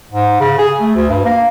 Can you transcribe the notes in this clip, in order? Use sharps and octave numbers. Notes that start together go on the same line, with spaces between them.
G#2
C#3
G#4
A3
D2
G2
A#3